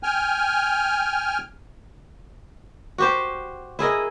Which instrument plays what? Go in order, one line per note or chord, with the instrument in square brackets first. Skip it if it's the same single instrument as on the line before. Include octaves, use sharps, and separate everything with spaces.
[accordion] G5 G#5 F6
[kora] F#4 G4 C5
E4 G#4 A#4 D#5